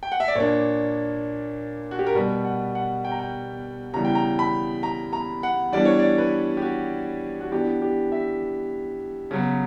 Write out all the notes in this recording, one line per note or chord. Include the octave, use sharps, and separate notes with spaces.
G5
F#5
E5
D5
A#2 A#3 D4 C#5
F#4
G4
A#4
B2 G3 B3 B4
F#5
F#5
G5
A#5
G5
C#3 E3 G3 B3 A#5
G5
A#5
B5
A#5
A#5
F#5
E3 G3 B3 D4 D5
C#5
D5
B4
G4
F#4
F#4
E3 B3 D4 G4
G4
E5
C#3 F#3 B3